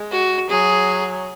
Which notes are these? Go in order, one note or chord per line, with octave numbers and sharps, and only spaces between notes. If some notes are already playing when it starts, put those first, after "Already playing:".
Already playing: G#3
F#4
F#3 G#4